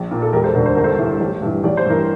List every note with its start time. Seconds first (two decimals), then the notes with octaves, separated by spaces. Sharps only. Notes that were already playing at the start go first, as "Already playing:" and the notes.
Already playing: A#1
0.11 A#2
0.22 A4
0.33 E1 G4 A#4
0.44 A4 C5
0.54 D2 D3 A#4 D5
0.66 C5
0.75 G1 A#4
0.84 A4 C5
0.99 G2 E3
1.20 A1
1.42 G2 E3
1.64 A1 D5
1.77 C5
1.85 G2 E3 A#4